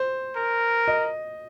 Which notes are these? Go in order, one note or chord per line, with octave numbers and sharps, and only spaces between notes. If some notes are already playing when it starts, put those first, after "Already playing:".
Already playing: C5
A#4
D#5